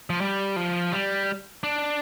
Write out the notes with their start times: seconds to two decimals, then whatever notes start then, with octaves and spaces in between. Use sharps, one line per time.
0.10 F3
0.21 G3
0.56 F3
0.93 G3
1.64 D4